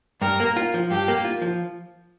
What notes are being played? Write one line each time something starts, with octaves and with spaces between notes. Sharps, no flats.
G2 A#4
A#3
F4
F3
G2 G4
A#3
F4
F3